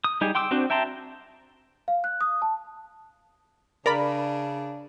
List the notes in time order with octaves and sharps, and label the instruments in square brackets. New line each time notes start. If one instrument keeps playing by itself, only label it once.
[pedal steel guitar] D#6
G3 D#4 G4 G#4
G5 C6 D6 E6
C4 D4 F#4 C5
E5 G5 A5 A#5 C6
[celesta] F5
F#6
D#6
A5
[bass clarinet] C#3 [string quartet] D4 [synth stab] A#4 D5 B5